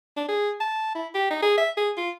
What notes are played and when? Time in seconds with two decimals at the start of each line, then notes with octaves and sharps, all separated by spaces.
0.17 D4
0.29 G#4
0.60 A5
0.95 E4
1.15 G4
1.31 D#4
1.43 G#4
1.58 E5
1.77 G#4
1.97 F4